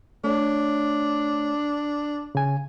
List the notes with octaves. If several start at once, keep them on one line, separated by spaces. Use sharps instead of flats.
A3 D4 C#5
C#3 G#5